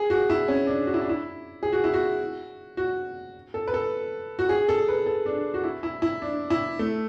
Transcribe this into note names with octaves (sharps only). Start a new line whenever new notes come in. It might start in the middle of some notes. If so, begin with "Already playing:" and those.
Already playing: G#4
F#4
E4
C#4
D4
F#4
E4
D4
E4
G#4
F#4
E4
F#4
F#4
A4
B4
A4
F#4
G#4
A4
B4
A4
D4
F#4
E4
E4
E4
D4
E4
A3